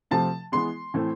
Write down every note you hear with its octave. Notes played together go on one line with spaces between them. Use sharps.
C3 F3 A3 C4 A5
E3 G#3 B3 C6
A2 E3 A3 C4